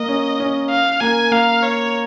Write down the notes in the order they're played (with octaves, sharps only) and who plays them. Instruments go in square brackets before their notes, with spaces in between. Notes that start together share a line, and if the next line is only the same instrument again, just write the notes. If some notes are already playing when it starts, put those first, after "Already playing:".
Already playing: [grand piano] A#3 [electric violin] D#5
[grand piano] C#4
C#4
[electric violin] F5
[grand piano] A#3 [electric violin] G#5
[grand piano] A#3 [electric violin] F5
[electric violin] C#5